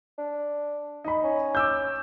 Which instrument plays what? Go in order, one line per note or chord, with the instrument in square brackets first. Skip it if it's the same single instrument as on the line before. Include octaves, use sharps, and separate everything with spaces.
[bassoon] D4
[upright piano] D#4 B5
[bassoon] C#4
[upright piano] D6 E6 G6